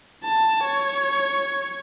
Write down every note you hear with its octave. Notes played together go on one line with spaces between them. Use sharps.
A5
C#5